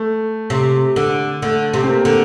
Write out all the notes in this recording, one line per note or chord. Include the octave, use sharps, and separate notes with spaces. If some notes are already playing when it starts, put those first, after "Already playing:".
Already playing: A3
C3
D3
D3 A3
C3
C4
A#3
D3